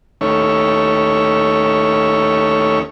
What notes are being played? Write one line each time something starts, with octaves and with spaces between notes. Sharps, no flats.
D#2 A3 C#4 C#5 E5